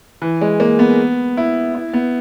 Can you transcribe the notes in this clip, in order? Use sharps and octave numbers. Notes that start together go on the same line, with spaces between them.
E3
G#3
A#3
B3
E4
E4
B3